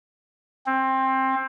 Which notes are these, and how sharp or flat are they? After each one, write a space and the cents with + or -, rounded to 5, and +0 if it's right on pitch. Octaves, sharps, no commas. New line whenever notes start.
C4 +20